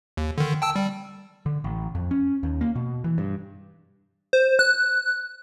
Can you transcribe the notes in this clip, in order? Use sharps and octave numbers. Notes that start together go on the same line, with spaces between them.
D#2
D3 D#3
G5 A5 E6
G3
D3
A1
F2
C#4
D#2
A#3
B2
E3
G2
C5
F#6